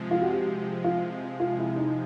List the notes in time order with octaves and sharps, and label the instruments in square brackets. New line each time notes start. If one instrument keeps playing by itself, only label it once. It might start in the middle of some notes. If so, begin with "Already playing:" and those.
Already playing: [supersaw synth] C3 F3 G#3
[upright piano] F4
F#4
G4
F4
F4
E4
D#4